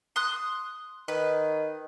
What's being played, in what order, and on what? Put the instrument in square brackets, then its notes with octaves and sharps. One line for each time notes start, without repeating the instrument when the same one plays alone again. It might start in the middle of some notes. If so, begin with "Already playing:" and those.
[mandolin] C6 D#6 F#6
[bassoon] D#3 [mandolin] B4